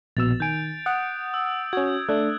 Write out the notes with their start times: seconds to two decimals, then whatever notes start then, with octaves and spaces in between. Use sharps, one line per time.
0.17 A#1 B2 E6 A6 F7
0.40 D#3 G#5 G6 D7
0.86 F#5 D#6
1.34 E6
1.73 C#4 F#4 G#6
2.09 A3 D4 F#6